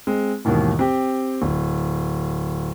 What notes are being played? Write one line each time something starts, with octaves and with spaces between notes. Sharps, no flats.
G#3 C4
D#2 G#2 B2 D#3 E3
C4 G4
D1